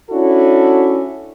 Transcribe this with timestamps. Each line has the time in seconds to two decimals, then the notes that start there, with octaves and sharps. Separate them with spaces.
0.10 C#4 D4 E4 F#4 A4